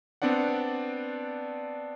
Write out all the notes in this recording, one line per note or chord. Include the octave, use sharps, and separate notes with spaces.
B3 C4 D4 D5 F#5